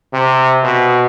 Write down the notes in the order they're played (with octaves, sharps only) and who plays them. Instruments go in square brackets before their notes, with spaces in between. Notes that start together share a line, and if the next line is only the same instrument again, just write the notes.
[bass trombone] C3
B2